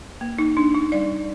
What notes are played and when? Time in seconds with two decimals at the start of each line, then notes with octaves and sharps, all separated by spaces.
0.21 A#3
0.39 D#4
0.57 D4
0.74 D#4
0.92 G3 D5